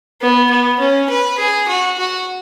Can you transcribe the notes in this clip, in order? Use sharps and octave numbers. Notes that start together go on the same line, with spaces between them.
B3
B3
C#4
B4
G#4
F#4
F#4